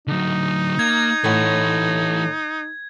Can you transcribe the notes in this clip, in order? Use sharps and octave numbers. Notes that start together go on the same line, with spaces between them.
D3 F#3 D#4
A#3 G#6
A2 E3 C#5 F#5